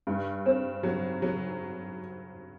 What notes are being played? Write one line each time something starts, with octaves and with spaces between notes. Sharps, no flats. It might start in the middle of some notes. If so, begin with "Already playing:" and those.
G2
C4
F#3
F#3